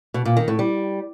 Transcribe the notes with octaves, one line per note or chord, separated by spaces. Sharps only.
B2
A#2
D#3
A2
G3